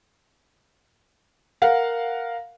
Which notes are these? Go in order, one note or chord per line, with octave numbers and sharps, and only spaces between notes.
A#4 F5 F#5